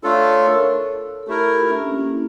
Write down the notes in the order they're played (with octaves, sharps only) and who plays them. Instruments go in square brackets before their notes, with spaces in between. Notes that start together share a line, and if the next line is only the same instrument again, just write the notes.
[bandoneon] A3 D4 F4 A4 [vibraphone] C#5
[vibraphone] C#5
A#4
A4
A4
[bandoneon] A3 E4 A#4 [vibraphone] G4
[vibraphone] F4
D4
C#4
A#3
D4
E4